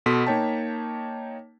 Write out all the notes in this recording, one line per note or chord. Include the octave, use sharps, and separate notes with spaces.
B2 B3 A4 C6 B6
A#3 D#4 C#5 G5 A5